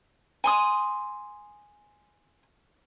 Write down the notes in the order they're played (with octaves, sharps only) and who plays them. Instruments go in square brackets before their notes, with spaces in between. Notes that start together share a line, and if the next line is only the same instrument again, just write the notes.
[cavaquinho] G#5 C6 D#6